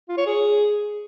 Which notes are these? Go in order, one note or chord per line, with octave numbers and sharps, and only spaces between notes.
F4
C#5
G#4